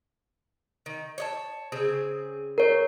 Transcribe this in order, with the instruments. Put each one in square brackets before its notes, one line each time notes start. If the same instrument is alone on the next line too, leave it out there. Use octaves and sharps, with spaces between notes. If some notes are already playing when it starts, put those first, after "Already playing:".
[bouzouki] D#3
C#5 D#5 A5
C#3 C4 G#4
[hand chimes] A#4 C#5